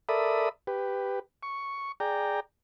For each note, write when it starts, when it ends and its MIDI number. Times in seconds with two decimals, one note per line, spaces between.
0.09 0.49 69
0.09 0.49 70
0.09 0.49 74
0.09 0.49 76
0.09 0.49 83
0.09 0.49 87
0.67 1.19 67
0.67 1.19 71
1.43 1.92 85
2.00 2.40 68
2.00 2.40 74
2.00 2.40 79
2.00 2.40 82